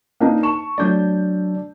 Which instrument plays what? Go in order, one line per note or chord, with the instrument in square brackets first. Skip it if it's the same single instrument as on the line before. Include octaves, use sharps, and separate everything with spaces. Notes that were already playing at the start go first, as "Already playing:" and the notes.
[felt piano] A#3 D4 D#4
A5 C#6 E7
[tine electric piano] F#3 D4 D5 [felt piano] A3 G6